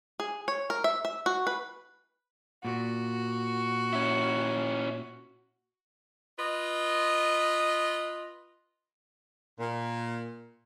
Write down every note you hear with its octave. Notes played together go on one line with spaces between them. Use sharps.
G#4
C#5
A#4
E5
E5
F#4
B4
A#2 F#4
C#4 E4
F4 B4 D#5
A#2